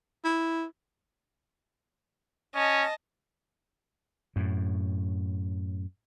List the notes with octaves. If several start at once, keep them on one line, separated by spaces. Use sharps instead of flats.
E4
C#4 D#5 A5
F#2 A2